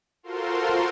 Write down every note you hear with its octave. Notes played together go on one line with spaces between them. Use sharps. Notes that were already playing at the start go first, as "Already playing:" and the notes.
F4 F#4 A4 A#4 C5 C6